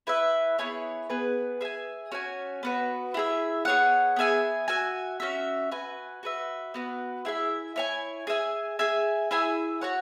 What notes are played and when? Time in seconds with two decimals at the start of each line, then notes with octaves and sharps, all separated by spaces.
0.07 E4 B4 E5
0.58 B3 E4 G#4 C#5
1.10 B3 G#4 B4
1.61 G#4 E5 G#5
2.11 C#4 F#4 C#5 G#5
2.63 B3 F#4 B4
3.14 E4 G#4 E5
3.65 B3 G#4 C#5 F#5
4.16 B3 G#4 E5 G#5
4.68 F#4 E5 G#5
5.20 C#4 F#4 E5
5.71 F#4 B4 G#5
6.23 F#4 B4 E5
6.74 B3 F#4 B4
7.25 E4 G#4 E5
7.76 E4 C#5 G#5
8.27 G#4 E5 G#5
8.79 G#4 E5 G#5
9.31 E4 G#4 E5 G#5
9.81 F#4 C#5 F#5